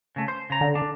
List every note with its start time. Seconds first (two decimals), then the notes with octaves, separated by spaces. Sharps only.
0.16 C#3 A3
0.28 C5
0.50 C#3 A#5
0.61 D3
0.75 D4